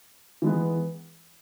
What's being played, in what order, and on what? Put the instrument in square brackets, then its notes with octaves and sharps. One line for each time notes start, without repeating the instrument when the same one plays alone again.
[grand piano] E3 G#3 B3